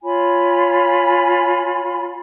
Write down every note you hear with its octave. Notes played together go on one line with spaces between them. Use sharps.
F4 C#5 G#5 B5